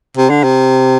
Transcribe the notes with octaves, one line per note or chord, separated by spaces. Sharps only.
C3
D3
C3